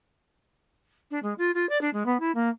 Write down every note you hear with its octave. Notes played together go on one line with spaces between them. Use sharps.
D4
G#3
F4
F4
D5
D4
G#3
B3
E4
A#3